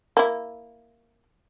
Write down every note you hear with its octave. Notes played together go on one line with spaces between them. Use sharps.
A#3 E4